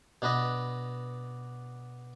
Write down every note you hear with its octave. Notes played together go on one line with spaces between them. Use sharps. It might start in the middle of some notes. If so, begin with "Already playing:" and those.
B2 D4 B4 D#5